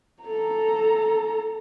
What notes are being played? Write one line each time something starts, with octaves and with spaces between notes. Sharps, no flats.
A4 A#5